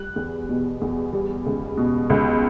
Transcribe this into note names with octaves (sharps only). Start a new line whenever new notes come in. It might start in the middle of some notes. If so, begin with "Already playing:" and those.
Already playing: G3 F#6
E2
B2
E2
G3
C#2
B2
C#2